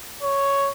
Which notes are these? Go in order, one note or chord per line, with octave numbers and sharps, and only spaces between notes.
C#5